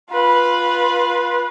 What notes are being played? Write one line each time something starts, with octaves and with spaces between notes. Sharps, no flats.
F4 B4